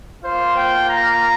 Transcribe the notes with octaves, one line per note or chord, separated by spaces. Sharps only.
A#3 F4 C5
G5
A#5